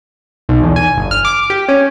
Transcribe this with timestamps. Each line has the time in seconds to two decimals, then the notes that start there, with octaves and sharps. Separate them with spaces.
0.49 B1
0.63 E2
0.76 G#5
0.98 G1
1.11 F6
1.25 D6
1.50 G4
1.69 C#4